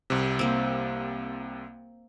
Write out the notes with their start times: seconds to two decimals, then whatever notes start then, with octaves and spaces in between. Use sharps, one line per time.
0.10 C2 C3
0.39 A#3 C4